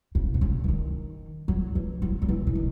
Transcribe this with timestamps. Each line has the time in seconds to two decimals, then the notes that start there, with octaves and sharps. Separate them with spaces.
0.15 C#3
0.34 C3
0.41 C#3
0.64 E3
0.68 D#3
1.48 F#3
1.75 E3
2.02 F#3
2.22 F#3
2.29 E3
2.47 C#3
2.55 D#3